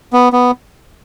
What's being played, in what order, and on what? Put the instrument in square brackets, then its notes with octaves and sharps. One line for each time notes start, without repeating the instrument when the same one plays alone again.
[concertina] B3
B3